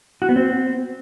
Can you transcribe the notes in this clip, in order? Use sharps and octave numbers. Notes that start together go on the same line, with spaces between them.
F#4
B3
C4